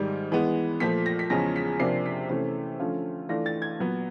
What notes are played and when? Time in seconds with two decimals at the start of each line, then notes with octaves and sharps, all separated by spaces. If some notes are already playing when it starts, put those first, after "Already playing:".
Already playing: G#2 D#3 G3
0.32 E3 G#3 B3
0.80 A#2 F3 A3 B6
1.06 A#6
1.19 B6
1.30 E2 C#3 F3 G#3 C#4 A#6
1.56 B6
1.80 C3 F3 A#3 D4 C7
2.06 B6
2.29 C3 E3 A3 C#4
2.80 D3 F3 A3 C#4 F4
3.29 E3 A3 D4 F4 A#6
3.46 A6
3.62 G#6
3.79 A#2 F#3 B3